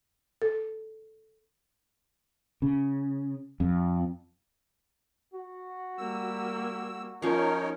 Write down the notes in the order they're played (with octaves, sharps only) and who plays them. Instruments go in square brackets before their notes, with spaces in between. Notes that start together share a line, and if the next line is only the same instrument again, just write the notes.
[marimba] A4
[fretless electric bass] C#3
F2
[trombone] F#4
[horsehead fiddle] G3 A#3 [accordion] E6
[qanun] F3 C#4 [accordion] D#4 C#5 [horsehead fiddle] A#4